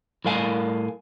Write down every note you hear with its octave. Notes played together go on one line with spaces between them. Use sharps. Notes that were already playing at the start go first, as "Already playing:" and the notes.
A2 G3 A#4 F5 G#5